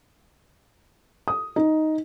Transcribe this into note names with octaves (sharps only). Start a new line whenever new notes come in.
D#6
D#4